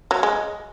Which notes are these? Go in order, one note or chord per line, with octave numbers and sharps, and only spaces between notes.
F#3
G#3